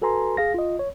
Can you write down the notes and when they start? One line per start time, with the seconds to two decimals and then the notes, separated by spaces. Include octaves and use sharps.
0.02 F#4 A4 B4 G#5 A#5 C6
0.37 G#4 F5 A#6
0.54 F4 D#5
0.79 C#5